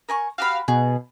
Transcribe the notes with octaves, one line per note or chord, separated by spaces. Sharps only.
A#4 G#5 C#6
F#4 G4 F5 B5
B2 G#4